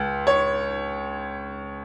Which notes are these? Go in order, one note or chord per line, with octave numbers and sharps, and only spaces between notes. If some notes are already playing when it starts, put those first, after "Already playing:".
Already playing: C#2
C#5